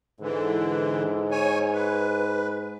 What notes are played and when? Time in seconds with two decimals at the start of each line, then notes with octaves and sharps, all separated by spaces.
0.20 G#2 D3 E3
1.31 C#5 G#5
1.74 B4